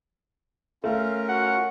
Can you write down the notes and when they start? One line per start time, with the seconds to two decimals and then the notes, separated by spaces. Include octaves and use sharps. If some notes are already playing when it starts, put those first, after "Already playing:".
0.84 A3 C#4 F4 A#4 F5
1.29 F#4 F#5